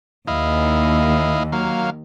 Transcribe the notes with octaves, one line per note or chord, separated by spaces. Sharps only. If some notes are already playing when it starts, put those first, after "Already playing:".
D#2 E4 D#5 F5
F#3 A#3 F5